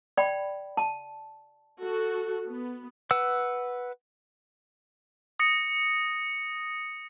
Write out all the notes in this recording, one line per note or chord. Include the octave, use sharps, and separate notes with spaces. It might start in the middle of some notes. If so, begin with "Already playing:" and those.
D5 G5 B5
A5
F#4 A4
B3
B4 F#5 E6
D#6 A#6 C#7